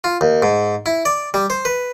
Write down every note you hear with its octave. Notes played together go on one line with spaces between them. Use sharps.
F4
D#2
G#2
E4
D5
G3
C5
B4